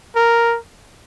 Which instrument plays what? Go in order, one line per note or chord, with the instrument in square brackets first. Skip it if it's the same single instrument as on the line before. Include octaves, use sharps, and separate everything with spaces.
[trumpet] A#4